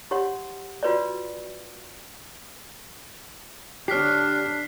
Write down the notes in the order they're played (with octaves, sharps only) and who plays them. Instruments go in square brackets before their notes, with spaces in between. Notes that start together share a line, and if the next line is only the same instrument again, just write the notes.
[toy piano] G4 C#5 F#5 C6
F4 F#4 B4 C#5 D5
[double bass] D3 D4 [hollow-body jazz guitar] G4 C#5 [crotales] F6 B6 C7